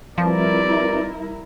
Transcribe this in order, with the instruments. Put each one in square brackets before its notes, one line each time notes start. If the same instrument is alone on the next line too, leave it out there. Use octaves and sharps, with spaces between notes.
[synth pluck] F3 [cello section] G3 E4 A#4 [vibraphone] C4 F4 B4 [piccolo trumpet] D5